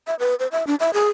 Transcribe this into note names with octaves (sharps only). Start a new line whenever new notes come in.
E5
B4
C5
E5
D4
E5
G#4